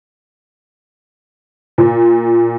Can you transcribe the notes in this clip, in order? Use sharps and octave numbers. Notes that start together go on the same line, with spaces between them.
A#2